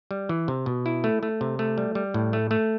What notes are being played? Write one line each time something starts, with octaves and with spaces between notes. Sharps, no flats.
G3
E3
C3
B2
E4
A3
A3
C3
A3
G3
G3
A2
A3
A3